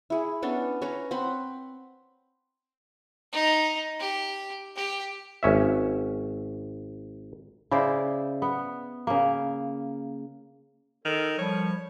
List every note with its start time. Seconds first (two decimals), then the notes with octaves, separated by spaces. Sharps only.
0.10 E4 G#4
0.42 B3 C#4 D4 A4
0.82 C#4 B4 C#5 A#5
1.11 C4 F#5 B5 C6
3.33 D#4
3.99 G4
4.76 G4
5.43 G#1 C#4 E5
7.71 C#3 E4 C5 D5
8.42 B3
9.07 C#3 A#3
11.05 D#3 A4
11.38 F3 G3 C#5